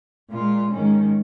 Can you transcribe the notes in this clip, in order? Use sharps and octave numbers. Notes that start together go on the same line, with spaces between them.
A#2 G#3 F4
G#2 D#3 G#3 C#4